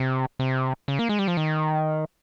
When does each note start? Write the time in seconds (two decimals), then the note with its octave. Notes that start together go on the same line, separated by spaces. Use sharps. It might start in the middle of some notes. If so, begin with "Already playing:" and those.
Already playing: C3
0.39 C3
0.88 C#3
0.99 A#3
1.09 G#3
1.19 G3
1.28 F3
1.37 D#3